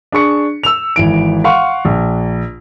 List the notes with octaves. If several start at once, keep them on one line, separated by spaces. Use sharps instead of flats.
D4 G#4 C#6 C#7
E6 F7
G#1 E3 D7
F5 F#5 C6 C#6
A#1